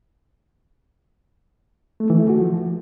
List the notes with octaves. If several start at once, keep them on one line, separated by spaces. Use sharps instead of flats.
A3
E3
A3
F#4
F3